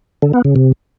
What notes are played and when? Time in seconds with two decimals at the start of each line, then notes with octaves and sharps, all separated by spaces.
0.22 D3
0.33 B3
0.45 C#3
0.56 C3